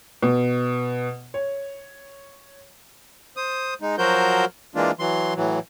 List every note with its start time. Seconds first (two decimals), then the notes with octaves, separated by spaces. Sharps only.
0.23 B2
1.34 C#5
3.37 C5 D#6
3.81 G#3 D#4
3.98 F3 F#3 F#4 A#4 C5 G6
4.75 E3 G#3 A#3 D4 F4
4.99 E3 F#3 C6
5.36 A2 E3 F#3